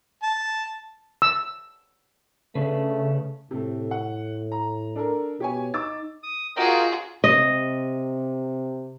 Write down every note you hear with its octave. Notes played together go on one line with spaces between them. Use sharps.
A5
E6
C#3 A3 C#4 D4 B4
A2 C3 A3
F#5
A#5
D4 A4 A#4
B2 G4 C#5 G#5
D#4 D6 E6 A6
D#6
F4 F#4 G#4 A#4 D#5 G5
C3 D#5